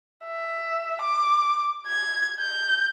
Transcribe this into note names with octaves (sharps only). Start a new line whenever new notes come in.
E5
D6
G#6
G6